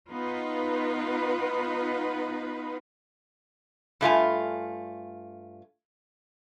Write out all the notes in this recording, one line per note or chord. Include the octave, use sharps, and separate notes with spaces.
B3 D#4 F4 B4
G2 A3 F4 G#5